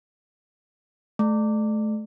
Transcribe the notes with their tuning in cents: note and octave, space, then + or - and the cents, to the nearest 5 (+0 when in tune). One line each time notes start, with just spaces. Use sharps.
A3 -30